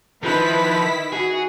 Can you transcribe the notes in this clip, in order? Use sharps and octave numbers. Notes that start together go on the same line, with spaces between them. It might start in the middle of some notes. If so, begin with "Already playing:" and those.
D#3 F3 E4 B4 B6
F#4 G#4